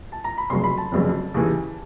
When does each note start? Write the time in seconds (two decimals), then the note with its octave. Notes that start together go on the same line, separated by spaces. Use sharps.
0.12 A5
0.24 A#5
0.38 B5
0.50 F1 F2 C#3 F#3 C6
0.64 B5
0.78 A5
0.92 F1 F2 C#3 F#3
1.34 D#2 C#3 E3